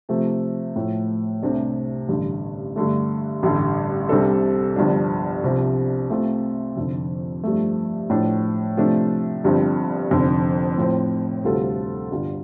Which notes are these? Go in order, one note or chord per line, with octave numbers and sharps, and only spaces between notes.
C3 F3 A3
A2 F3 A3
C2 C3 A3 D4
A1 G2 D3
G2 D3 A3
A1 G2 D3 G3
C2 C3 G3 D4 A4
G1 G2 F3 D4
C2 C3 F3
C3 A3 C4 F4
F1 F2 D3
G2 F3 A3
A2 F3 D4
C3 F3 A3 D4
G1 G2 F3 C4
F1 F2 D3
A2 F3 C4
D2 C3 G3 F4 A4
G1 G2 G3 F4